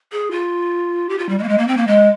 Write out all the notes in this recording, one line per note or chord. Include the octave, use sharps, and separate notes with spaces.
G#4
F4
G4
F4
G3
G#3
A#3
G#3
A#3
C4
A#3
G#3